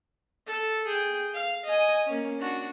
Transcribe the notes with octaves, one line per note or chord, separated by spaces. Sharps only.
A4
G#4 G5
F5
D#5 G#5
A#3 C#4
D4 F#4